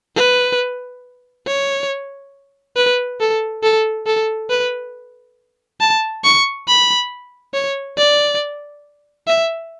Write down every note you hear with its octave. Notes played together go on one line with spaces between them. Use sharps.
B4
C#5
B4
A4
A4
A4
B4
A5
C#6
B5
C#5
D5
E5